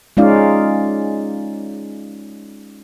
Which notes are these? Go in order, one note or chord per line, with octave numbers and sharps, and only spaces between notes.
G#3 C#4 D#4 F4 D5 F5